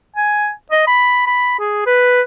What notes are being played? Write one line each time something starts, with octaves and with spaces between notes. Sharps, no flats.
G#5
D#5
B5
B5
G#4
B4